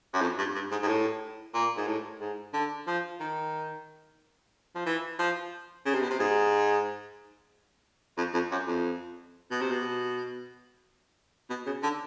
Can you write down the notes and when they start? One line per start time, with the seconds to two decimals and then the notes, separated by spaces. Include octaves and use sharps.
0.14 F#2
0.21 F2
0.38 G2
0.55 G2
0.71 G#2
0.82 G#2
0.88 A2
1.54 A#2
1.77 G#2
1.87 A2
2.20 G#2
2.54 D3
2.87 F3
3.20 D#3
4.75 F3
4.86 E3
5.19 F3
5.86 C#3
5.94 C3
6.02 B2
6.10 C3
6.19 G#2
8.18 F2
8.34 F2
8.51 F#2
8.67 F2
9.51 B2
9.61 C3
9.71 B2
11.50 B2
11.66 C#3
11.83 D3